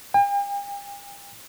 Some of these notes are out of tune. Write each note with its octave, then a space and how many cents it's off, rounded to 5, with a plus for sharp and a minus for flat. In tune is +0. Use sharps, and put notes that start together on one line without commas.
G5 +45